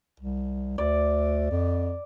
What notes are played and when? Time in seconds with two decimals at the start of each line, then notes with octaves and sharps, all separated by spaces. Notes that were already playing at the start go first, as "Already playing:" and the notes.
0.20 C2
0.78 D2 D5
1.51 F2